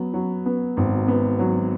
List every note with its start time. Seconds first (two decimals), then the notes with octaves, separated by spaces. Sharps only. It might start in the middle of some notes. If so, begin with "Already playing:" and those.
Already playing: F#3 B3
0.14 F#3
0.46 B3
0.77 G#1
1.08 B3
1.39 F#3